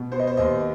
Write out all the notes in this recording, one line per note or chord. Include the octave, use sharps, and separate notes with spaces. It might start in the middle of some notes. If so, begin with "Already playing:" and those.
Already playing: B2
B3 C5
D#5
C5
D#2 D#5